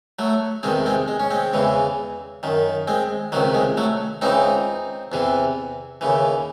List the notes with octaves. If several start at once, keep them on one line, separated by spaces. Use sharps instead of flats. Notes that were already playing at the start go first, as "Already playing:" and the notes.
F#3 A3
E2 C3 D#3 G#3 C4
G#3 C4
G#3
C#4
G#3 C4
E2 C#3 E3
F#2 D#3
G#3 C4
C#2 C3 D#3 F#3
G#3
F#3 A3
C#2 C#3 E3 C4 D#4
E2 C3 E3
D#2 C#3 E3